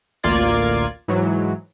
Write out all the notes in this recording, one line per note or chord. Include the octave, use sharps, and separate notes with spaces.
A1 D2 A#3 F4 D5 G#6
G#2 E3 F#3